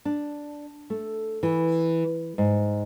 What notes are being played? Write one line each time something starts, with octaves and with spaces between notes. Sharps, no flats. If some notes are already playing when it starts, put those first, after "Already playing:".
D4
A3
E3
G#2